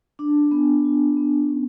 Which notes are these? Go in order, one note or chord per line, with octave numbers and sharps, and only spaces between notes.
D4
B3
F4
B3
C#4